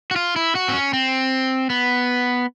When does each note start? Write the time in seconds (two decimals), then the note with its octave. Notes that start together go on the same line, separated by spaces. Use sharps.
0.11 F#4
0.16 F4
0.36 E4
0.55 F#4
0.68 C4
0.73 C#4
0.93 C4
1.70 B3